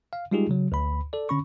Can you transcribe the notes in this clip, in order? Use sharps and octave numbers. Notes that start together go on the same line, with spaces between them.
F5
G3 G#3 D#4 F4 G4 G#4
C#3 F#3
D2 B5
A4 D5
D3 C#4 B5 C#6